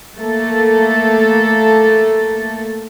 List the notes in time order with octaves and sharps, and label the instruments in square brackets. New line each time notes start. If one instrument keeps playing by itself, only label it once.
[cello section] A3 A#3 A4